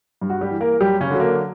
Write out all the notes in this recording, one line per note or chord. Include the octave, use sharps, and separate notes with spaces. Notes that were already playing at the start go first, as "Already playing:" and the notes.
G2
F#4
G3 G4
E3
A#3 A#4
F#2 G3 G4
C#3 C#4
D3 F#3
A#3